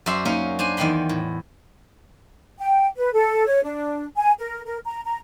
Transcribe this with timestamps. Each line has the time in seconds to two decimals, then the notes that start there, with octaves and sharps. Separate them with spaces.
0.06 F#2 F#4 C5 D5 E5 C6
0.25 A#3 C#4 D#4 A#4
0.59 D4 C5 G#5
0.77 E2 D#3 D#5 G5 B5 C6
1.09 A2
2.59 G5
2.97 B4
3.13 A4
3.47 C#5
3.63 D4
4.17 G#5
4.40 A#4
4.65 A#4
4.86 A#5
5.05 A#5